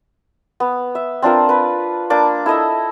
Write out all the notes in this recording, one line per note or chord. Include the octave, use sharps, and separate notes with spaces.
B3
E5
C4 D4 F4 A#4
B4 B5
A#3 D4 D6
E4 A4 D#5 E5